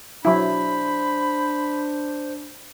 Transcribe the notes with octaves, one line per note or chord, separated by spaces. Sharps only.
F#3 D4 E4 C5 B5